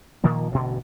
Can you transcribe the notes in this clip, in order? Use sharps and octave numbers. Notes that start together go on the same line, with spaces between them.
A#2 D#3 F3 A#3
A1 G2 B2 D3